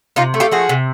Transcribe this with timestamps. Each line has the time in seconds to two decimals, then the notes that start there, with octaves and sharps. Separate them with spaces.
0.16 C3 D#4 F4
0.34 A3
0.40 F4 G4
0.51 F3 F#4 G#4
0.69 C3